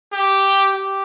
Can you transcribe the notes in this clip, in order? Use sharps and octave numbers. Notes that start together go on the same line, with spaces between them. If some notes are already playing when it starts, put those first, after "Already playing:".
G4
G4